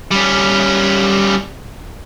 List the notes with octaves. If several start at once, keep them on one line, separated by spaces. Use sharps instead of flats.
G3 C#4